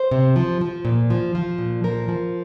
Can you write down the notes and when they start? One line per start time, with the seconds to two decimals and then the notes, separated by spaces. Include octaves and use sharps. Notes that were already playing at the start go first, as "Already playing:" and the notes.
Already playing: C5
0.11 C3
0.36 F3
0.61 F3
0.85 A#2
1.10 F3
1.35 F3
1.58 A#2
1.84 F3 A#4
2.08 F3